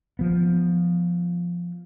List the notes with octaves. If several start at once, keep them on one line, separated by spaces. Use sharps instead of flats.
F3 B3